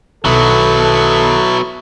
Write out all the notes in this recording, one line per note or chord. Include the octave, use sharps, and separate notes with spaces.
B1 D#3 F#3 B3 E4 A4 A5 C#6